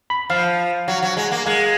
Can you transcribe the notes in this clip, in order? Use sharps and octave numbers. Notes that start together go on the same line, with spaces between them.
B5
F3 F5
F#3
F#3
G#3
A#3
G#3 F5